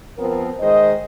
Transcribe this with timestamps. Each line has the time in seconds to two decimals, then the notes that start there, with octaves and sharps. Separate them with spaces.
0.18 F3 B3 C4 A#4
0.60 D#3 G#3 C5 D#5